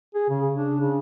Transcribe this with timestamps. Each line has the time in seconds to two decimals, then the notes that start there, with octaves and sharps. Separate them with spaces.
0.15 G#4
0.29 C#3
0.57 D4
0.80 C#3